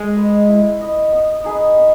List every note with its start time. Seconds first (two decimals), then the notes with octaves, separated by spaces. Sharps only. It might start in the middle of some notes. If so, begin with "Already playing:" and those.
Already playing: G#3
0.16 B4 D#5
0.49 E4
0.81 B4 D#5
1.12 B3
1.44 D#4 G#4 B4
1.77 B3